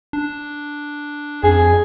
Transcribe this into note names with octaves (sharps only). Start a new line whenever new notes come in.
D4
F2 G#4